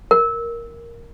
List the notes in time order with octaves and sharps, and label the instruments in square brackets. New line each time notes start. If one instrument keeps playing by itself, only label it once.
[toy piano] A#4